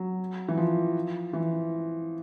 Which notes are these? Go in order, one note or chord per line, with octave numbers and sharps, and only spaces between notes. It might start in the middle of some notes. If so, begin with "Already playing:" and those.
Already playing: F#3
E3
F3
E3